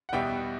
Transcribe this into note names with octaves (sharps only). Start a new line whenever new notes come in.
F#5
E2 B2 G3 B3 E5 G5